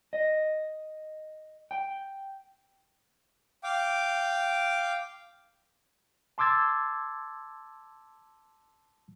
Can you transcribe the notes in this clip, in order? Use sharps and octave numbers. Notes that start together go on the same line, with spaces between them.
D#5
G5
F5 G5 D6
A5 C6 D6 E6 G#6 A6